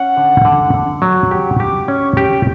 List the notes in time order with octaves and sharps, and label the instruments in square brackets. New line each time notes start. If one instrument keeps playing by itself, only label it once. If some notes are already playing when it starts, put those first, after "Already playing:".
Already playing: [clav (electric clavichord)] C#4 [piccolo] F#5
[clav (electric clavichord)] D3
D3
D3
F#3
[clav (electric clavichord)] G4 [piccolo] F#5
[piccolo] C#6
[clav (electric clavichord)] G4 [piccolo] D6
[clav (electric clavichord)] C#4 [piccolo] C#6
[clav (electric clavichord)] G4